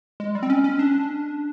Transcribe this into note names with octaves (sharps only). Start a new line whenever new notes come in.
G#3
G3
C4
C#4
C#4
D4